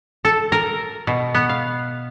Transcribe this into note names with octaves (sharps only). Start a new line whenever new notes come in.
A4
A#4
B2
B3
F5